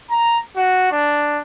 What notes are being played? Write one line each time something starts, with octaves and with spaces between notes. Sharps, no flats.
A#5
F#4
D4